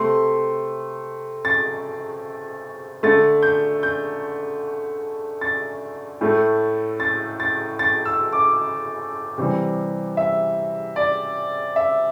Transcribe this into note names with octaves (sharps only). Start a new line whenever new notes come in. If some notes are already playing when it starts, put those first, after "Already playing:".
Already playing: C3 A3 C6
A6
D3 A3 A6
G6
G6
A6
A2 A3
A6
A6
A6
E6
D6
C3 E3 G3
E5
D5
E5